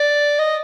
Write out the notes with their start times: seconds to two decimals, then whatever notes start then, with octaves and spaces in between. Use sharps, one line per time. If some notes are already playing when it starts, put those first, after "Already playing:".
Already playing: D5
0.39 D#5